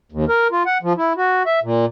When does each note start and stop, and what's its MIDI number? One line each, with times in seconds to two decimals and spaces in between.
0.12 0.25 39
0.29 0.47 70
0.52 0.63 65
0.66 0.78 78
0.83 0.93 53
0.98 1.13 64
1.17 1.43 66
1.46 1.60 76
1.63 1.85 46